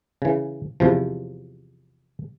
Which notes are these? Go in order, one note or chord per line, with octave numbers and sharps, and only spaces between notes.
C#3 E3
E2 C3 F3